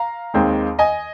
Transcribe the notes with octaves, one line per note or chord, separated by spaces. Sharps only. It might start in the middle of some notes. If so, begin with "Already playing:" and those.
Already playing: F5 A#5
D#2 D#3 G#3 C4
D#5 G#5